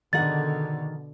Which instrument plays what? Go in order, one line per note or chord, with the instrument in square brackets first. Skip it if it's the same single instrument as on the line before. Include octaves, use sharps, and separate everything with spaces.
[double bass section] B2 D3 [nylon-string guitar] D#3 G#4 F#5 [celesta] A6